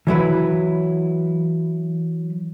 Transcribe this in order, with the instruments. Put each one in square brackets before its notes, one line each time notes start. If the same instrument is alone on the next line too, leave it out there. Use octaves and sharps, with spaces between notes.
[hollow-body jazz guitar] E3 F#3 E4 B4